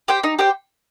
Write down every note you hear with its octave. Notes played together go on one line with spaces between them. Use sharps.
G4 C5 G5
D#4
G4 C5 G5